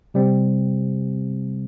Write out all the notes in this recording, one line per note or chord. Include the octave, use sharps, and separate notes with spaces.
C3 G3 C4